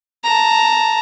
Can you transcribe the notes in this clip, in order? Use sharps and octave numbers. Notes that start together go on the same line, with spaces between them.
A5 A#5